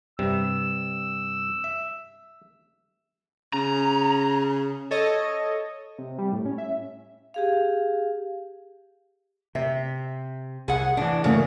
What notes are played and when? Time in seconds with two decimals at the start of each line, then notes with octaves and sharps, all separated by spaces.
0.19 G2 C3 G3 E6
1.64 E5
3.53 C#3 A#5
4.91 A4 C#5 D#5
5.98 C3
6.18 G3
6.32 A2
6.45 C#4
6.58 E5
7.34 G4 G#4 F5
9.55 C3 E5
10.68 C2 G#4 F#5
10.97 A2 E3 D4
11.24 F#2 C#3 A3 A#3